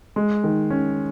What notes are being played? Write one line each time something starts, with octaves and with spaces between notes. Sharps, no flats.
G#3
D#3
C#4